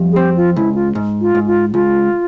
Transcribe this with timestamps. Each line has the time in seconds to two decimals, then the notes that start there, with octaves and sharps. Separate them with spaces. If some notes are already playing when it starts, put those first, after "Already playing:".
Already playing: F2 G3
0.12 G#4
0.16 C4 G4
0.37 F4
0.56 C#2 E4
0.75 F4
0.95 G#2
1.21 F4
1.35 G#2
1.47 F4
1.73 C#2 F4